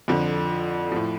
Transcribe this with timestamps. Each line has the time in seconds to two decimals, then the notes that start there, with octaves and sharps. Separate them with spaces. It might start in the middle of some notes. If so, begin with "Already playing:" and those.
0.08 F2 D3 F3
0.92 A2 F3